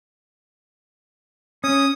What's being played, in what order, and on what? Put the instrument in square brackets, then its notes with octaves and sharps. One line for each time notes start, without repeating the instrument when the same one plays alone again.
[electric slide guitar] C#4 [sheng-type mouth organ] D#6